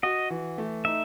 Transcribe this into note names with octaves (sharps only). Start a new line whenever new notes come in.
F#4 D#5
E3
A3
D#4 E5